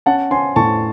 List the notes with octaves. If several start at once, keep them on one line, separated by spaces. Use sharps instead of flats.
C#4 F#5 A5
C#4 G#5 C6
A2 A5 C#6